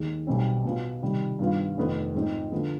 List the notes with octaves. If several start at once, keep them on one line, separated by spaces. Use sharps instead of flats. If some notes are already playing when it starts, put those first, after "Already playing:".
Already playing: D#2 D#3 G#3
B1 B2 G3 C4
B2 B3 F4
C3 D#3 G3
G2 D#3 G3 B3 F4
F1 F2 D#3 B3
G#2 F3 C4 D#4
D3 F3 B3